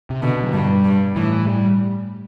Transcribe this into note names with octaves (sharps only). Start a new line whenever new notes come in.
C3
B2 D3
F#3
G2 G3
G2
A2 E3
G3